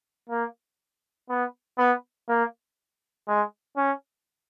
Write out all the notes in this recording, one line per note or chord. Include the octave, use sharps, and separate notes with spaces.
A#3
B3
B3
A#3
G#3
C#4